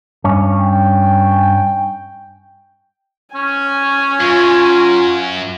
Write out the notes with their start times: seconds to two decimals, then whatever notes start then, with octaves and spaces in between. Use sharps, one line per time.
0.24 G2 C#4
0.60 G5
3.35 C#4 G#5
4.20 F#2 F4